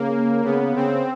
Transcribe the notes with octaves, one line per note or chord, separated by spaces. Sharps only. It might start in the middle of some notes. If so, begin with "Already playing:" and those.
Already playing: C#3 A#3
C#3 B3
C#3 C4